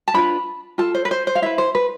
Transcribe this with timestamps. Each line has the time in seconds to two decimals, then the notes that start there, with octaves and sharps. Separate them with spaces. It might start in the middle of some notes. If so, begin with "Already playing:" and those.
0.08 A5
0.14 D4 F4 B4 B5
0.78 F4 A4 A5
0.95 C5
1.05 B4
1.11 C5
1.27 C5
1.35 F5
1.42 E4 B4 E5
1.58 C5
1.75 B4